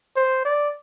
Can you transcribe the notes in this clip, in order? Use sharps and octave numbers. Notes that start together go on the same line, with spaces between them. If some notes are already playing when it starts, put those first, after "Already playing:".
C5
D5